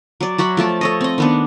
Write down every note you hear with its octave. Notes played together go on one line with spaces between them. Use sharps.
F#3 D5
F#3 F#4 E5 B5
F3 A3 A4 D6
A4 C#5 D#5
C4 D#5
D#3 B3 D4